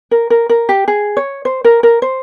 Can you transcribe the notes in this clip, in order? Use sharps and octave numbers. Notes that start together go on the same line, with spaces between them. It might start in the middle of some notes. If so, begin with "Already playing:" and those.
A#4
A#4
A#4
G4
G#4
C#5
C5
A#4
A#4
C5